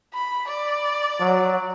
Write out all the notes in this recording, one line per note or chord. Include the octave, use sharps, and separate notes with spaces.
B5
D5
F#3